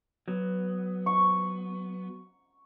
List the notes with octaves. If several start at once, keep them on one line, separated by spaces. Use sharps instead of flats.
F#3 B3
C#6